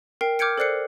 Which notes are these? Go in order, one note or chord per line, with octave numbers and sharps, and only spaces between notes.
A#4 G5 C7
D6 F6 G6 G#6 C#7 D7
A4 C5 D5 F#6 C7 C#7